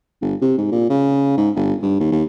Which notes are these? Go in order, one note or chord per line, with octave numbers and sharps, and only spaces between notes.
G1
C3
G#2
A#2
C#3
G#2
G1
G2
D#2
D#2